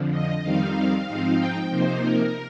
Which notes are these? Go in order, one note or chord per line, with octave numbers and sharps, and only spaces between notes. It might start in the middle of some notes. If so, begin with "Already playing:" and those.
Already playing: F2 D3 F3
D#5
F2 D#3 G3 C4 D#4 F5
G#2 F3 C4 D#4
G5
C3 F3 A#3 D#4 C5
A#4